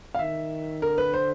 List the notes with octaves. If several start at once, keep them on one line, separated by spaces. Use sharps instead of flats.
F5
D#3 E5
D3 A#4
B4
C5